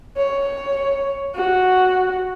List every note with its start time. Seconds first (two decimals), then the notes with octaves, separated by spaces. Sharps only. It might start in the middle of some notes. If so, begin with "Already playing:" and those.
0.17 C#5
1.35 F#4